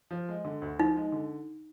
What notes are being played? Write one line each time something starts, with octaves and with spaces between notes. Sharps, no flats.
F3
G#3
D3
D2
F3 D#4
G#3
D3